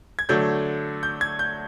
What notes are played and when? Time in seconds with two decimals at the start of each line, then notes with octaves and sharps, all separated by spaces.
0.19 G#6
0.29 D3 F#3 A3 D4 G6
1.03 G6
1.21 G#6
1.39 G6